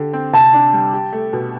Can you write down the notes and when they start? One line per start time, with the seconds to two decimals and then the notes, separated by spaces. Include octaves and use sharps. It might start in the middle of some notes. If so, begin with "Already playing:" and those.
Already playing: D3 G4
0.13 C4
0.33 C3 A5
0.53 D4
0.73 G3
0.93 G4
1.13 A3
1.33 B2